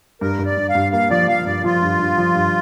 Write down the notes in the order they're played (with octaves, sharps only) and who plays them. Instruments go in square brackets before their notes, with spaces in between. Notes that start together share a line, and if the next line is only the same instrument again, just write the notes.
[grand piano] G2 [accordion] A#4
[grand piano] G2
[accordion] D5
[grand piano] G2
[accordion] F5
[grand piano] G2
[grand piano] A#3 [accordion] F5
[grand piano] F3 [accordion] D5
[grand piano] F3 [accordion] F5
[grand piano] G2 [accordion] D5
[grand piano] F3 [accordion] F4
[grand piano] G2
G2
F3
G2